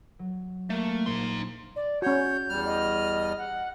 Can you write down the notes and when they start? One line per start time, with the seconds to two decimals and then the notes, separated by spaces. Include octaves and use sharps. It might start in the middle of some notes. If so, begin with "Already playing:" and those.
0.19 F#3
0.70 A3 A#3
1.06 A#1 A#2 D#4 C6 G6
1.76 D5
2.02 C#4 F#4 C#5 G6
2.49 E2 G3 F6
2.65 D#5
3.38 F#5